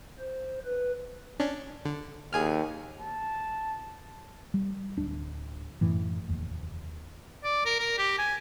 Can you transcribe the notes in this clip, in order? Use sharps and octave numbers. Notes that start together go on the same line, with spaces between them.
C5
B4
C#4 D4
D3
D#2 G#4 G#5 F6
A5
G3
D1 D4
F#2 A2 E3
F1 D#2
D5
A#4
A#4
G4
G#5